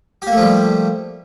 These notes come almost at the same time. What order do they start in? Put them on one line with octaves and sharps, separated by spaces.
G4 A#3 A3 F3 G3